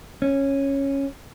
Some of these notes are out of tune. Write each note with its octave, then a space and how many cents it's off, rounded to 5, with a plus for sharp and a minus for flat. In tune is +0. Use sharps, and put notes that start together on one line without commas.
C#4 -10